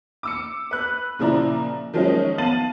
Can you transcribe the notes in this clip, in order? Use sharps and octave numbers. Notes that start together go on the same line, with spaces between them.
D6 E6 C#7
B4 F#6
A#2 C#3 F3 E4 D5 A#5
D#3 F3 F#3 G#3 C#4 D#4
B3 F5 A5 A6 D#7 F#7